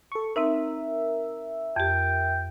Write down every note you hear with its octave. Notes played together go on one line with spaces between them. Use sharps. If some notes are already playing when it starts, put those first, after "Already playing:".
A4 C#6
C4 D#4 A#4 E5
F2 G4 G5